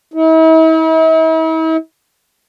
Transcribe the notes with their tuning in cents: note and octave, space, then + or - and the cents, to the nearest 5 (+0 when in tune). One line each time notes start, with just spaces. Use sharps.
E4 -45